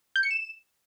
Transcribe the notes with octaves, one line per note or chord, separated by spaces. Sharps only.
G6
C#7
E7